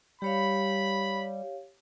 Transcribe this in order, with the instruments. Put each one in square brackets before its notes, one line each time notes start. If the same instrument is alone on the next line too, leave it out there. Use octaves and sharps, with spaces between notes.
[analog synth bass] G3 [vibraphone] G4 C#5 F5 [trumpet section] B5